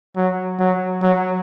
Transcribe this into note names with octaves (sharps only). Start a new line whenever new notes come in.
F#3
F#3
F#3